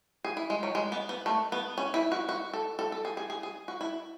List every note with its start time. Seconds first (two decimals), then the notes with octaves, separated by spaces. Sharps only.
0.25 G#4
0.37 E4
0.50 G#3
0.63 F#3
0.75 G#3
0.92 B3
1.09 B3
1.26 A3
1.52 B3
1.78 C#4
1.94 E4
2.12 F#4
2.29 F#4
2.53 A4
2.79 A4
2.92 A4
3.05 G#4
3.17 G#4
3.30 G#4
3.43 G#4
3.68 F#4
3.81 E4